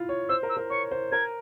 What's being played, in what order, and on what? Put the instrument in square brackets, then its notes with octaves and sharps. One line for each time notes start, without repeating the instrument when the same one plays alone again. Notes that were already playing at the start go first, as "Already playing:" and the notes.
Already playing: [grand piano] E4 F4
C#5
[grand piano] C5 [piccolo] E6
[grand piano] A#4
[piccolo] E6
[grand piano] A#4
[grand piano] C#5 [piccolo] C#6
[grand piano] C5
[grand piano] A#4 [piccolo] G#6